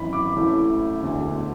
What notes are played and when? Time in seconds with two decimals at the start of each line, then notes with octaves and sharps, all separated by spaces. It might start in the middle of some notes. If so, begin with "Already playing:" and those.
Already playing: G#1 F#2 E3 B5
0.13 D6
0.36 A1 A2 E3
1.02 E1 D2 D3